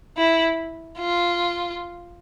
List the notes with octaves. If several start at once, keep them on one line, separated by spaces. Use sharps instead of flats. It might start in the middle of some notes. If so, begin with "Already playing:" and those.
E4
F4